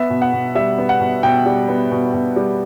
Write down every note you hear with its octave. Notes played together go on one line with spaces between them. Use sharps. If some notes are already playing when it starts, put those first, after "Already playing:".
Already playing: B3 E5
B2
F#5
B2
G3 E5
B3
F#5
B2
B2 G5
G3
B3
B2
B2
G3